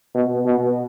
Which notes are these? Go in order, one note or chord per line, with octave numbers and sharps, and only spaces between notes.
B2
B2